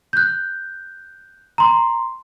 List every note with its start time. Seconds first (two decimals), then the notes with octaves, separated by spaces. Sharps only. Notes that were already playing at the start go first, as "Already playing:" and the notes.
0.13 F#6 G6
1.58 A#5 C6